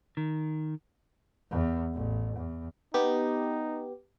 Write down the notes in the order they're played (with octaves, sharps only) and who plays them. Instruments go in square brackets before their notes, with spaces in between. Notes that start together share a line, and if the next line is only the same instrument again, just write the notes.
[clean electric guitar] D#3
[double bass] E2
A1
E2
[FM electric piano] B3 G4 [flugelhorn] D#4